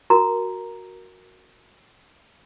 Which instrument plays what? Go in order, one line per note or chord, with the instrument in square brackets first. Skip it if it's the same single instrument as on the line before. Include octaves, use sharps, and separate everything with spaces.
[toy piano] F#4 A#4 A#5